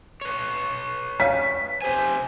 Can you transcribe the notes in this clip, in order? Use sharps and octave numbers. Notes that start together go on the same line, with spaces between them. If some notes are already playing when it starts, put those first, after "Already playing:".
B4 C#5
C#4 F5 B6
C3 G4 C5 G#5